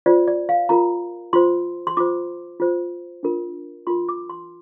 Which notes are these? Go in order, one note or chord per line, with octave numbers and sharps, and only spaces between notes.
F4 C5 D5
D5
F5
F4 A#4 A#5
F4 C5 C6
C6
F4 C5 D6
F4 C5
D4 F4 A#4
F4 A#4 C6
D6
C6